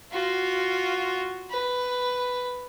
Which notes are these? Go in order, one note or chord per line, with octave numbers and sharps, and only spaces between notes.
F4 F#4
B4